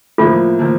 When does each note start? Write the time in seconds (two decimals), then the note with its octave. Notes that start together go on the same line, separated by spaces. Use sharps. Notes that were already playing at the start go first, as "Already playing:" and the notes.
0.18 A2 F3 A#3 F4
0.59 A2 F3 A#3